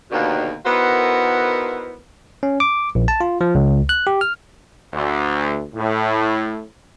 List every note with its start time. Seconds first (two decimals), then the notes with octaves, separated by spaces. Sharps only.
0.11 D#2 B2 D3
0.66 D#3 B3 E4 F#4 A#4 C5
2.43 C#4
2.60 D6
2.95 A#1
3.08 A5
3.21 F4
3.41 F3
3.55 C#2
3.89 F#6
4.07 G4
4.21 F6
4.93 D2
5.75 A2